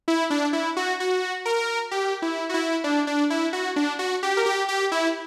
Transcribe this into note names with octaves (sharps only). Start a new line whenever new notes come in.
E4
D4
E4
F#4
F#4
A#4
G4
E4
F#4
E4
D4
D4
E4
F#4
D4
F#4
G4
A#4
G4
G4
E4